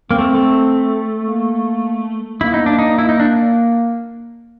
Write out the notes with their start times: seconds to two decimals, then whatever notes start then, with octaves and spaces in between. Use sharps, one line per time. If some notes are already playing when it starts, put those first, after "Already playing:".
0.11 A#3 C4
0.18 A3
0.35 A3
1.25 A#3
2.41 A#3 E4
2.51 B3 D#4
2.62 A#3 D4
2.79 D#4
2.98 E4
3.09 D#4
3.20 D4